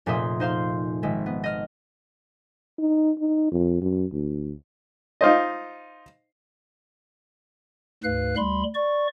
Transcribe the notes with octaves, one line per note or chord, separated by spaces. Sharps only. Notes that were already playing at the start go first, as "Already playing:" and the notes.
F1 A#2 G#4 E5 C6 D#6
D#4 C5 F5 C6
G#1 G#3 E5
B3
D#5 F6
D#4
D#4
F2
F#2
D2
D#4 F4 C5 D#5
D2 G#2 B4 F5 F#6
D2 G3 B5 C6
D5 C#6